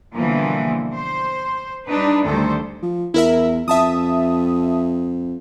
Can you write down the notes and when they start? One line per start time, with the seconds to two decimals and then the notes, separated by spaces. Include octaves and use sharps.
0.14 B2 D3 E3 F3 G3 A#3
0.94 C5
1.87 G3 D4 D#4 B4
2.25 D2 D#3 G3 A4 C5
2.83 F3
3.14 E2 E4 A#4 E5
3.68 F2 E5 A5 D#6